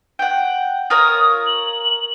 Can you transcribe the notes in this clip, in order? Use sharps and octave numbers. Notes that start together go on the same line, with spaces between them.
F#5 G5
F4 A#4 C#5 D#6
F#7